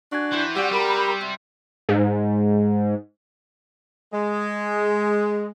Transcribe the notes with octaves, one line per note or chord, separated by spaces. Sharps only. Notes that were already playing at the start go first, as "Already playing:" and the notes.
D4 F#4 G#5
E3 C5 G5
G3 C4 F#4 G4 D5 F#5
G3 A#4 B5
C3
G#2
G#3